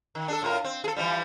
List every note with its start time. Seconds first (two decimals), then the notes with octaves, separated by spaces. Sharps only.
0.15 D#3
0.28 D4 G#4 A4
0.42 A2 F4 A#4
0.64 C4
0.84 G#4 A4
0.97 E3 F3 G3